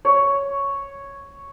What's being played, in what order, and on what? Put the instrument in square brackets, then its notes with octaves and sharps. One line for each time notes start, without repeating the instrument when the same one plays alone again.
[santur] C#5